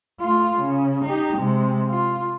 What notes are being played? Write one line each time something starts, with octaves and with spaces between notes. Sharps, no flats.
A3 F4
C#3
D#4 G4
C3 G#3
F4